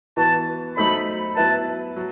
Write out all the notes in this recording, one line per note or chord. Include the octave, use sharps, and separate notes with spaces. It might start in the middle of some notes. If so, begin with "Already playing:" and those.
E3 B3 F#4 A5
F#3 A3 D#4 A4 C5 B5
F#3 B3 E4 B4 A5
F#3